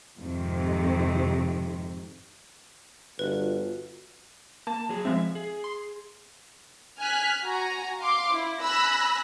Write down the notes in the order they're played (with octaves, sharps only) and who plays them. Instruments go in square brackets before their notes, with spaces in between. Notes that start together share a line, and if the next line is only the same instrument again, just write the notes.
[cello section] F2 G#2 C3 D#3
[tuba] G1 [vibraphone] F4 F#4 [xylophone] B4
[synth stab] A#3 [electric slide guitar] A5
[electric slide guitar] F#3 G#4
[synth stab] F3 G#3 C4 [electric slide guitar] E5
[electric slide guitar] G#4
[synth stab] C6
[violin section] G#5 F6 F#6 B6
F#4 G#5 A#5
F5 C6 D6
E4
G#5 B5 E6 F#6 A#6